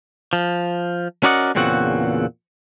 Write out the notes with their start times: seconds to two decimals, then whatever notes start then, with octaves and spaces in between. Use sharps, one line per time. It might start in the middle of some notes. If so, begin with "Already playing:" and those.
0.33 F3
1.23 C#4 F#4 A#4 D5 D#5 F#5
1.55 E2 A#2 C#3 C4 F#4 F#5